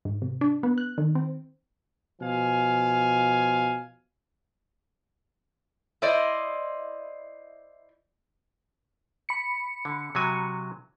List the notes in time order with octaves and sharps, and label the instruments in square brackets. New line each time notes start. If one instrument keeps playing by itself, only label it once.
[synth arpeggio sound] G#2
C3
D4
B3
F#6
D#3
C4
[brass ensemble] B2 F3 F5 G#5
[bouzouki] E4 C5 D5 D#5
[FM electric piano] B5 C#7
[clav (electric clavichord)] D3
C3 F#3 G#5